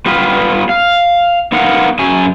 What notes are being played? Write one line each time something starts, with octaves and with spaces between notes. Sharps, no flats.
G3 B3 F4 B4
F5
B3 D#4 A#4 F5 F#5
F#2 C#3 F#3 G#5